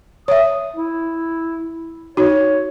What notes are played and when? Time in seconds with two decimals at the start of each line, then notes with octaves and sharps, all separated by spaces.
0.28 C#5 E5 D#6
0.76 E4
2.17 D#4 F#4 C#5